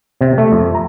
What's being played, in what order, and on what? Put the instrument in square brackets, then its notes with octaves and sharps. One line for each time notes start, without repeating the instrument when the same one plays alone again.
[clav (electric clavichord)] C3
A3
F2
A#5